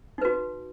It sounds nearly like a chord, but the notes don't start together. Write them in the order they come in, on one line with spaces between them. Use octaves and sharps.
D#4 B4 F#4